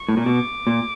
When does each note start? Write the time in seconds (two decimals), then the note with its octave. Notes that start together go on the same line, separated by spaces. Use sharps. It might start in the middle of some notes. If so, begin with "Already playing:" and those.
Already playing: C#6
0.09 A2
0.17 A#2
0.26 B2 D6
0.67 A#2